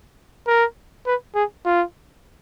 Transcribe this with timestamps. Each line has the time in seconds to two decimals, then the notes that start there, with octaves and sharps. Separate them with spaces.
0.47 A#4
1.06 B4
1.35 G#4
1.65 F4